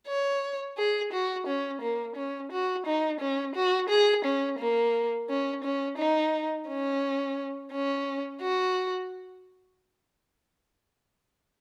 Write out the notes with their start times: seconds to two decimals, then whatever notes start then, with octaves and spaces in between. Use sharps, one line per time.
0.08 C#5
0.77 G#4
1.13 F#4
1.47 C#4
1.81 A#3
2.16 C#4
2.52 F#4
2.87 D#4
3.21 C#4
3.55 F#4
3.90 G#4
4.25 C#4
4.59 A#3
5.30 C#4
5.64 C#4
5.98 D#4
6.68 C#4
7.72 C#4
8.42 F#4